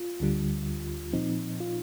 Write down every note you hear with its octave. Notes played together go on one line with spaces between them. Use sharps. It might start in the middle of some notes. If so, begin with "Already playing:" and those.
Already playing: F4
D2 D3 G3
A#2 F3 C4 D#4
F4